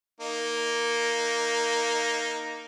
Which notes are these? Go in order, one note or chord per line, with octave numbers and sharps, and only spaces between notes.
A#3 D#4